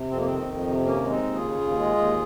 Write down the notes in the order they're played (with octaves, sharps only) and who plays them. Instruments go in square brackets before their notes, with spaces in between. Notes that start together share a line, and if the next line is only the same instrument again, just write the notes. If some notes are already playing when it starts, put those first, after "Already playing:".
Already playing: [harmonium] C3
F2 C4
A#3
D#3 C4
F2
C3
D#2 A#3 C#4
G#3
C4 D#4
D#2
F4 G#4
C#3
D#2
G#3
D#2